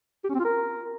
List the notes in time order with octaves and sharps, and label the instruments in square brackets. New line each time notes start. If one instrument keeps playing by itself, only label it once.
[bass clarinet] G4
C#4
C4
F4
A#4